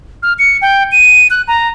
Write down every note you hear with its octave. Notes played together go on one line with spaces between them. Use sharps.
F6
C#7
G5
D#7
F#6
A#5